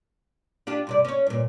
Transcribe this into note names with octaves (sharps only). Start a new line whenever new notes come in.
D4 F4 G4
G2 C3 D5
C#4 C#5
G2 A#2